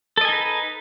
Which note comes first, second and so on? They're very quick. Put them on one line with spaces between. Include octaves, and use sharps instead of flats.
A4 D#5 G#5 D#4 B4